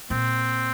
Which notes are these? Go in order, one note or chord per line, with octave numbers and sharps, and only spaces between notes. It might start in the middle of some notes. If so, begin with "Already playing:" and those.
A#2 C4